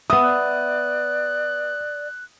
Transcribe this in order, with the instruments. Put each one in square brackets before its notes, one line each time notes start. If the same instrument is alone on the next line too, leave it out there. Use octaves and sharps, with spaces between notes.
[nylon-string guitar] B3 E5 [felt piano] D#6
[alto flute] D5 [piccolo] F#6